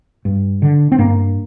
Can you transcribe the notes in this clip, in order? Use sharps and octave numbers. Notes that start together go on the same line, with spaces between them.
G2
D3
C4
G2 A#3